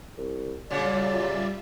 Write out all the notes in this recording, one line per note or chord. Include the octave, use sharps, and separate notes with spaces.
C2
A#2 C#3 F#3 G3 F4 D5 E5